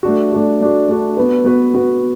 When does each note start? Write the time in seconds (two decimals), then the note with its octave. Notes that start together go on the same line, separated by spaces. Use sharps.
0.03 A3 D4 F#4
0.32 A3 D4 F#4
0.60 A3 D4 F#4
0.88 A3 D4 F#4
1.17 B3 F#4 B4
1.45 B3 F#4 B4
1.74 B3 F#4 B4